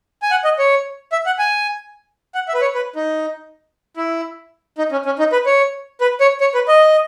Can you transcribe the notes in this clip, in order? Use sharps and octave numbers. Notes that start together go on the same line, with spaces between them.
G#5
F#5
D#5
C#5
E5
F#5
G#5
F#5
E5
B4
C#5
B4
D#4
E4
D#4
C#4
C#4
D#4
B4
C#5
B4
C#5
C#5
B4
D#5